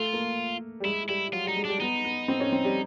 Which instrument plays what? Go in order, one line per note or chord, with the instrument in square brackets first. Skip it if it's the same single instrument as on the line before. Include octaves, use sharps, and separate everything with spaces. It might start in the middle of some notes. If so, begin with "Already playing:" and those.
Already playing: [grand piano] A3 [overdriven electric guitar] F4
[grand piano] A#3
G3
[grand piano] G#3 [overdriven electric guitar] E4
[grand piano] G3 [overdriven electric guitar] E4
[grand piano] F#3 [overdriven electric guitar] F4
[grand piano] G3 [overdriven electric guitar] D#4
[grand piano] G#3
[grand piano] G3 [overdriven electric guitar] D4
[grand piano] B3 [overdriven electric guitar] D#4
[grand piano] B3
C4
C#4
C4
G3